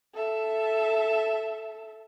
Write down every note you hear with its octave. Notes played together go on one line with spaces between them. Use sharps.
A4 E5